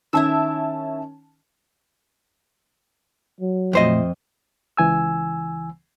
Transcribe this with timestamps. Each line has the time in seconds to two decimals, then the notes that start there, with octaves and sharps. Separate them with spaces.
0.13 D#3 C#4 E4 E5 A5 E6
3.40 F#3
3.73 F2 A#2 A3 C5 D#5
4.77 C#2 E3 G#5 E6